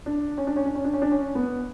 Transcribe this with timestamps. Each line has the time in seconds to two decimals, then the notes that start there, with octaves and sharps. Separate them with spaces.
0.06 D4
0.38 C#4
0.47 D4
0.56 C#4
0.65 D4
0.75 C#4
0.84 D4
0.93 C#4
1.02 D4
1.11 C#4
1.35 B3